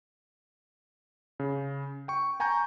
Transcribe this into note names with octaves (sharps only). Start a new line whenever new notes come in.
C#3
G5 C#6
G5 G#5 A#5 C#6 G6